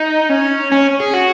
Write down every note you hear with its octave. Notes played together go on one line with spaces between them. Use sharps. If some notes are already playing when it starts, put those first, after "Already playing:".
Already playing: D#4
C#4
C#4
G#4
F#4